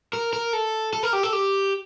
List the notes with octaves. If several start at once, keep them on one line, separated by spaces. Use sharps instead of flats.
A#4
A#4
A4
A4
A#4
G4
A4
G4